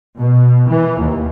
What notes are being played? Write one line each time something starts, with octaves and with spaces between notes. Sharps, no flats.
B2
E3
D#2